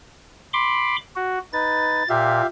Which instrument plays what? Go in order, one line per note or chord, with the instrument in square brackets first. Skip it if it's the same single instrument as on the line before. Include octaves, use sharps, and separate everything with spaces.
[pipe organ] B5 C6 D6
F#4
[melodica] D#4 B4 [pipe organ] A6
[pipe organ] A#2 [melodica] G4 E5 F5